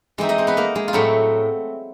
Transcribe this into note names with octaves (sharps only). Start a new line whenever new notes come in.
E3 G#3 C4 D#4 E4 E5
D#4 D#5
C4 C5
B3 B4
A#3 A#4
G#3 G#4
F4
A2 F#3 A3 C4 E4